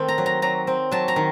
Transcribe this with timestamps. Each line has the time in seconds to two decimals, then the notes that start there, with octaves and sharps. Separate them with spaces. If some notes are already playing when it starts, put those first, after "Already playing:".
Already playing: D#3 A3 C4
0.08 A#5
0.18 F#3
0.26 A#5
0.42 F#3 A#5
0.67 C4
0.92 F#3 A5
1.08 A#5
1.16 D#3